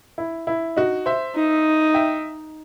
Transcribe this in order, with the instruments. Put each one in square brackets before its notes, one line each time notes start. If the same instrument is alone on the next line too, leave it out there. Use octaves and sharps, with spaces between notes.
[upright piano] E4
E4
D#4 F#4
C5 E5
[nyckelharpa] D#4
[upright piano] E5 G5